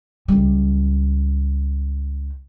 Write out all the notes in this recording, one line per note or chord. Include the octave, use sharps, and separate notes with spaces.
C#2 G3